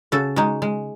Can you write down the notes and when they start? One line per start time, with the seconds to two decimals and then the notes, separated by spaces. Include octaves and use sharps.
0.12 C#3 F#4 A4
0.36 G#3 D#4 F#4
0.62 G#3